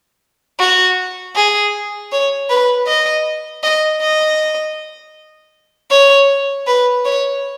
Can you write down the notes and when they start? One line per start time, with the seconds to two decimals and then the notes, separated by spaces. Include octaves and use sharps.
0.59 F#4
1.36 G#4
2.11 C#5
2.50 B4
2.87 D#5
3.63 D#5
4.01 D#5
5.91 C#5
6.67 B4
7.05 C#5